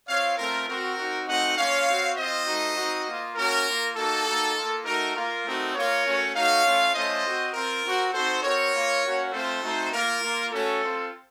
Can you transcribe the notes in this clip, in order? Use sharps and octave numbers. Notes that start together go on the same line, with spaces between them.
C4 F4 C#5 F5
A3 C4 F4 A#4
C4 F#4 A#4
C4 D#4 F#4
A3 C4 D#4 F#4 D#5 F#5
A#3 C#4 F4 C#5 F5
C4 F#4
C4 F4 C5 D#5
A3 D#4 F#4
C4 D#4 F#4
A#3 F4
A#3 C#4 F#4 A#4
A#3 F4
A#3 D#4 F#4 A4
A#3 D#4 F#4
A#3 F4
A3 D#4 F#4 A#4
A#3 F4 A#4
A3 C4 D#4 F#4
A#3 F4 A#4 C#5
A3 C#4 F#4
A3 D#4 F#4 C#5 F5
A3 C#4 F4
A3 C#4 F4 C5 D#5
C4 F#4
C4 F4 A#4
C4 F#4
C4 D#4 F#4 A4 C5
C4 F#4 A#4 C#5
A#3 F4
A#3 C#4 F#4
A3 C4 F4 A4 C5
A3 C4 D#4 F#4
A#3 F4 A#4
A#3 F4
A3 C#4 F#4 A4
C4 F4